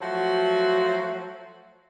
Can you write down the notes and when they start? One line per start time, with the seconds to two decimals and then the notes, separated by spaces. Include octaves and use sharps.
0.01 F3 F#3 A3 F#4